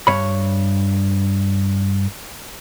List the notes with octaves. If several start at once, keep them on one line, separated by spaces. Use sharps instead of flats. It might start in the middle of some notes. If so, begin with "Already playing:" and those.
G2 C#5 B5